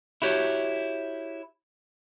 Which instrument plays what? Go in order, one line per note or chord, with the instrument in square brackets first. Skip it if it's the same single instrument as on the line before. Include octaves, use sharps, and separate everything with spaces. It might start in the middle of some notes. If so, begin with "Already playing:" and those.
[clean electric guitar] E4 F#4 G4 C#5